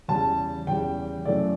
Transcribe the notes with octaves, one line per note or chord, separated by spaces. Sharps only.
E2 C#3 G3 A5
E2 C#3 G3 G5
F#2 C#3 E3 A3 D5